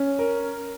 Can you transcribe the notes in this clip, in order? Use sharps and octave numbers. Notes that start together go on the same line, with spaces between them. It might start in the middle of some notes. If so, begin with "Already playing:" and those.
Already playing: C#4
A#4